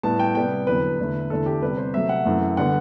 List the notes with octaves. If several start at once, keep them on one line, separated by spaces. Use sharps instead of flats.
A2 G3 B3 A5
G5
C3 G3 B3 G5
E2 D3 F#3 B3 B4
E2 D3 A3
E2 D3 A3 A4
G4
C3 G3 B3 B4
C5
C3 F#3 A3 E5
F#5
F#2 E3 A3
D3 G3 B3 F#5